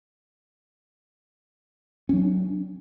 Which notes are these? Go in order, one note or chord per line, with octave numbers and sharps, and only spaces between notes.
F#3 C#4 D4